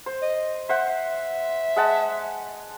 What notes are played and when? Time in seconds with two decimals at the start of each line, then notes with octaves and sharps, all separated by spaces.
0.06 C5
0.22 D#5
0.69 C5 E5 F#5
0.89 E5
1.76 G#3 F#5 A5